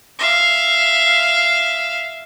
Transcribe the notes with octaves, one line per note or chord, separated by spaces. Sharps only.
E5 F5